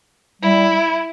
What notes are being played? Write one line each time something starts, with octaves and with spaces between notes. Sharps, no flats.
G3 E4